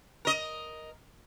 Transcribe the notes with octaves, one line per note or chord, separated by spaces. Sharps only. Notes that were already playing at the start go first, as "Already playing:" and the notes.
A#4 D#5